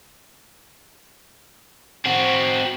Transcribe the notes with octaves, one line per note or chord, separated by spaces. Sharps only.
C4 F#4